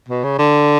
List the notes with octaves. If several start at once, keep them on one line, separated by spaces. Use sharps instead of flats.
B2
C#3
D3